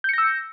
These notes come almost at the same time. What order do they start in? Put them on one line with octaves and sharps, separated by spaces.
G6 C#7 A#6 E6